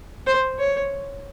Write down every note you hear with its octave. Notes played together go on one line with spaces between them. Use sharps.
C5
C#5